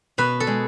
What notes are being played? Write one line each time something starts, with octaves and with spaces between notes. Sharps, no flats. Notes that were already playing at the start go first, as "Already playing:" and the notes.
B2 B4
A4
G#3